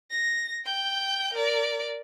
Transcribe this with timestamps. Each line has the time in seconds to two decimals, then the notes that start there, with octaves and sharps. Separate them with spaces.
0.11 A#6
0.65 G5 G6
1.33 A#4 D5